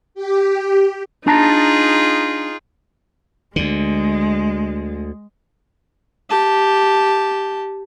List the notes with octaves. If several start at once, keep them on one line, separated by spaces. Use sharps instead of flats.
G4
D4 D#4 F4 G#4 A5 A#5
D2 D3 G#3
G4 A5